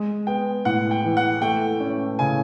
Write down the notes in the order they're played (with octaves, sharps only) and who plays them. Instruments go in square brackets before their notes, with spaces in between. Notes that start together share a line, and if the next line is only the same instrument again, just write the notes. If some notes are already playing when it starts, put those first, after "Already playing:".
Already playing: [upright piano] G#3
[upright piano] B3 [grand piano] G5
[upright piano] A2 [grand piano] F#5
[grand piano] G5
[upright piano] E3
[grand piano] F#5
[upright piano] A3 [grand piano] G5
[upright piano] C#4
[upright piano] C#3 [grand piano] G#5